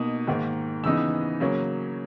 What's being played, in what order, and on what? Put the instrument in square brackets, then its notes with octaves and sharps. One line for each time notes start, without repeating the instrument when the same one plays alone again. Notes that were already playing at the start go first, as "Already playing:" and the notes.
Already playing: [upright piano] B2 A#3 D#4 D#6
G#2 D#3 A#3
C#3 E3 B3 D#4 E6
C#3 F#3 A#3 C#4